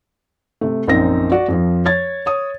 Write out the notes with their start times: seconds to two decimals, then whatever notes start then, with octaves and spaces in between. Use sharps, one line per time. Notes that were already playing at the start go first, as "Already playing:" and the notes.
0.61 C3 A3
0.87 A#1 F#2 C4 D#4 A#6
1.32 F#4 D5
1.48 F2 F3
1.85 C#5 G#6 A6
2.26 C#5 D#6